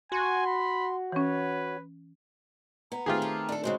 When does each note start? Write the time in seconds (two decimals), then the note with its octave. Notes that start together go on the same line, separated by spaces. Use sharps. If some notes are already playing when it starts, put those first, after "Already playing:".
0.12 F#4 G#5 C6
0.46 B5
1.12 E3 C#4 B4 C#5
2.92 B3 A#5
3.06 D#3 A3 C4 F4 G4 G#4
3.22 A4
3.49 D4 A4
3.63 C#3 G#3 F#4 C5